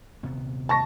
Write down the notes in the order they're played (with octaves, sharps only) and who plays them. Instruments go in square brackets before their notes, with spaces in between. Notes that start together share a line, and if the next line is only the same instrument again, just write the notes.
[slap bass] D#1 C3 B3
[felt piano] A5 C#6 A#6